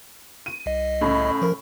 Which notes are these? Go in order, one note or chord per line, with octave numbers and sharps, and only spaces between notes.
D#7
C2 D#5
A2 C#3
F3 A#4